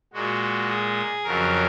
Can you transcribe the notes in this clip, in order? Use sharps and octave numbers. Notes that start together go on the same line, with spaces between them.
A#2 G#3 F#4
G#4
F2 C#3 F#3 A#4